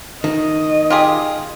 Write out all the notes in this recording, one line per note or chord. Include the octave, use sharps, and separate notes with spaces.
D#3 D#5
F4 G4 G#4